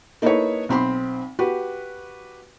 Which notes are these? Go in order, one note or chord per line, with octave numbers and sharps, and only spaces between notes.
A#3 D#4 E4 A4 B4 C#5
B1 C4 B5 C6
F#4 G4 B4